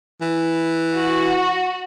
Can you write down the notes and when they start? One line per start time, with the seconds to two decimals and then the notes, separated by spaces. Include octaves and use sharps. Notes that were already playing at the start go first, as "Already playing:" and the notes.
0.21 E3
0.94 F#4